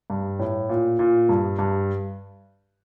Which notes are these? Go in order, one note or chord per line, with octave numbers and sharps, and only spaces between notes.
G2
A2
A#2
A#2
G2
G2